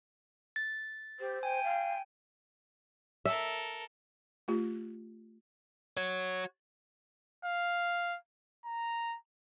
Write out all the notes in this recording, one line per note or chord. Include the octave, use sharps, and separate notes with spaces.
A6
G4 C5
G5 G#5
F5
A4 A#4 E5
A3 F4 G4
F#4 C#5
F5
A#5